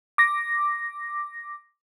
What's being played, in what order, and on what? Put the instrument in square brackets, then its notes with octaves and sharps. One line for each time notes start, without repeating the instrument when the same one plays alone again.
[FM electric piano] D6 A#6